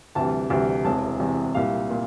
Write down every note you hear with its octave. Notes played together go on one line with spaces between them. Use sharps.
D2 C3 E3 G3 A5
D2 C3 E3 G3
E1 E2 C3 A5
E1 E2 C3
C2 A#2 G3 F5
A#2